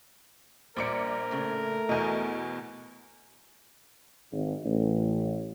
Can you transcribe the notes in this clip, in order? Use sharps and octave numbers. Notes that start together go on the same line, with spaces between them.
A#1 G3 A#3 A#4 C5 D5 D6 C#7
A2 C#3 A3
E2 B2 D#5
G#1
A1